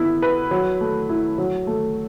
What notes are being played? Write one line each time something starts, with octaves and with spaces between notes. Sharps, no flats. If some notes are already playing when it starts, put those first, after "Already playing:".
Already playing: B3 E4
B4
F#3
A3
E4
F#3
A3